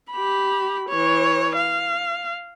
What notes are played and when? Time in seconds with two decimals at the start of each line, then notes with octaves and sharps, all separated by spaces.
0.12 G4 B5
0.89 E3 C#5
1.56 F5